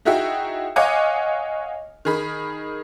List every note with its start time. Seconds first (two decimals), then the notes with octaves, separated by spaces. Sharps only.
0.05 D#4 E4 F#4 G#4 E5 G5
0.76 C#5 D#5 F5 F#5 G#5 D6
2.05 D#3 G#4 B5